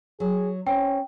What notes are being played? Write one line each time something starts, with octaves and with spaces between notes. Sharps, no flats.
F#3 G#4
C4 C#4 G5